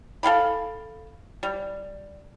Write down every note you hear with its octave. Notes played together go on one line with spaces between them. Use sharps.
A4 F5 G5 B5
G3